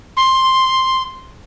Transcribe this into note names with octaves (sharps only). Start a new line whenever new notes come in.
C6